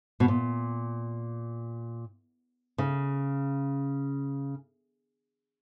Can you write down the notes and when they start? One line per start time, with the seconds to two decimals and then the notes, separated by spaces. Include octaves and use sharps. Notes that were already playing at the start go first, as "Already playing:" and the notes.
0.20 B2
0.28 A#2
2.78 C#3